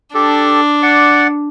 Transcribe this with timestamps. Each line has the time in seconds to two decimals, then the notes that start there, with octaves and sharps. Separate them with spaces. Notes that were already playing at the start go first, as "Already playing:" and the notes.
0.14 D4 G4 A4
0.83 D5 F#5